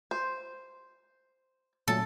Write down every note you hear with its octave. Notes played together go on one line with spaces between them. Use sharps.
C5
A#2 F#3 A3 A4